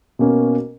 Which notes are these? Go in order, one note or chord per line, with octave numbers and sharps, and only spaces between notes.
B2 A#3 C#4